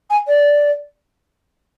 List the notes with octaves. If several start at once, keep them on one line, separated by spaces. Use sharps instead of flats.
G#5
D5